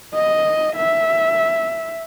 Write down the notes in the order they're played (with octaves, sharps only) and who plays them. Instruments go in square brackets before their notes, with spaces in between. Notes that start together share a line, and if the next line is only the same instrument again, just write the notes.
[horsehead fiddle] D#5
E5